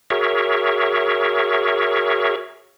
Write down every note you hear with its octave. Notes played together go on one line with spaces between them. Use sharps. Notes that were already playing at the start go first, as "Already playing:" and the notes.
F#4 G#4 A#4 C#5 E5